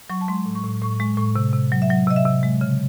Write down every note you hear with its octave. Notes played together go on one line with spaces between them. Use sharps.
F#3 C#6
A5
G#3 C6
A2
C#6
A2
A2 C#6
G#3 C#6
A2 C#6
C3
C3
F#3
E5
F#3 F#5
C3 D#5
E5
C3
G#3
C#3